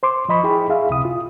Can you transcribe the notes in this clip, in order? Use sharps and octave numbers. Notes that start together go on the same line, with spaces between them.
C5 C6 D6
F3 D#5 B5 C#6
E4 G#4 G5 B5
E4 G#4 E5 F5
C#2 C3 D#6
F4